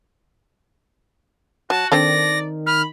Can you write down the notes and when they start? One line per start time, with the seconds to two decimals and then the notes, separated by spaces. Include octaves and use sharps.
1.70 F#3 F#4 A5
1.92 D#3 C4 D4 A4 D5 A#6
2.67 B5 F6